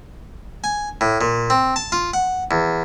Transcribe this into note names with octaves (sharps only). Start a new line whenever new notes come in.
G#5
A2
A#2
C4
A5
F4
F#5
E2